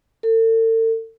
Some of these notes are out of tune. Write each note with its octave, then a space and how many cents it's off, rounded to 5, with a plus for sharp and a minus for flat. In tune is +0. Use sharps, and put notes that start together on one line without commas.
A4 +40